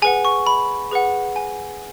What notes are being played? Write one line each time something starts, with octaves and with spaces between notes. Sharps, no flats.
G#4 B4 F#5 G#5
C#6
B5
G#4 B4 F#5
G#5